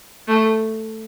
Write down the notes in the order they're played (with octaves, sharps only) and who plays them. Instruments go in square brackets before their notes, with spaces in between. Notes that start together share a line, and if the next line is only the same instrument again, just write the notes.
[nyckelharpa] A3